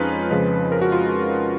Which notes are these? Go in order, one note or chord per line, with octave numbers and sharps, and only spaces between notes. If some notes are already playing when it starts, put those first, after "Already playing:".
Already playing: F2 F3 G#3 C#4 D#4 F4 B4
F2 C#3 F3 G#3
A#4
F#4
F4